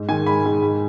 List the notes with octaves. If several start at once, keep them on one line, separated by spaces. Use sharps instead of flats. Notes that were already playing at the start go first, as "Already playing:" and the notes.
Already playing: G#2
D#3 G#3 G#5
G#2 B5
D#3 G#3
G#2